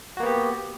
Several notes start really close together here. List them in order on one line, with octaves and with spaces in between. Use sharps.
F#4 A#3 B3 G4